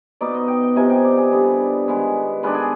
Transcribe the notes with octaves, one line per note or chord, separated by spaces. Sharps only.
B2 B3 D#4 D5
D#5
G5
G5
C3 F3 B3 D#4 G#5
G5
D5
G#4
D3 G3 B3
D#3 G#3 B3
D#3 G#3 D4 B4
G#4